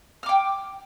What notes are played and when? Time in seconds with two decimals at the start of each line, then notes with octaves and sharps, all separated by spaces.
0.23 F6
0.26 D6
0.29 G5